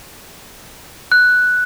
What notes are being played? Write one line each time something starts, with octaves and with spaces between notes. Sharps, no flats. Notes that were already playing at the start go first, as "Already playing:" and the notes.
F#6